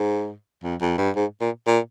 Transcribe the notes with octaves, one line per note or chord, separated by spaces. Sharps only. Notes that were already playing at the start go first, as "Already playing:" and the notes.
Already playing: G#2
F2
F2
G2
G#2
A#2
A#2